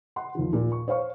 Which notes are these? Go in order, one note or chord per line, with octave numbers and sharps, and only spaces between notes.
F#5 C6
D#2 F3
A#2
C#6
C5 C#5 F5 C#6